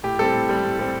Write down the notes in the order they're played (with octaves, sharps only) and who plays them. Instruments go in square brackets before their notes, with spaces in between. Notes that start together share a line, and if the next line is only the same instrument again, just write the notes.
[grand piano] A2 G4
G3 C4 A4
A2
G3 C4
A2
G3 C4